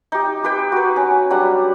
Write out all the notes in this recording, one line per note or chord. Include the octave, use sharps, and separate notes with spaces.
D#4 G4
G4 B4 G5
F#4 B4
C#4
F#3 G3 D4 F#5